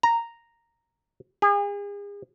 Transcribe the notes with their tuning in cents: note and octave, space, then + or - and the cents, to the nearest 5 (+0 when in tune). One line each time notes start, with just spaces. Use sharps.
A#5 -5
G#4 -40